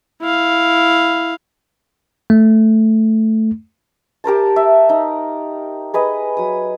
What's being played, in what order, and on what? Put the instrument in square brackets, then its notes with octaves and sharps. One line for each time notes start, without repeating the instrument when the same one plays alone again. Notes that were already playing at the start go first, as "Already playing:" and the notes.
[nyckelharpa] E4 F5
[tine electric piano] A3
[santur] G4 A#4 C5 A5
E5
D#4
G#4 B4 D#5
F#3 D#6